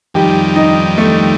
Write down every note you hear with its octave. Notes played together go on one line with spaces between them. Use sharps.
F2 D#3 G3 G4
D#4
A3